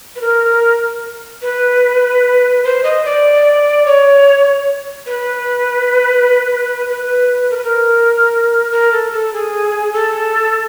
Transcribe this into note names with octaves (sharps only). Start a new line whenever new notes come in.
B4
A#4
B4
C5
D#5
D5
C#5
B4
B4
A#4
B4
A#4
A#4
A4
A4
G#4
A4